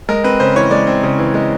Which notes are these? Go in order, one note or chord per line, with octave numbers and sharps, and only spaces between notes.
G#3 A#4
C4 B4
C#3 C5
E3 C#5
G#3 D5
C4
C#3
E3
G#3